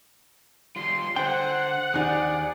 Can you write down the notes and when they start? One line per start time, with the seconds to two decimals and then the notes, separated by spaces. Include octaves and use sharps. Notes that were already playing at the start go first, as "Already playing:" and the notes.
0.76 G3 F4 C6
1.16 D3 C5 F#5 G5
1.94 D#2 D#4 G4 G#4 D5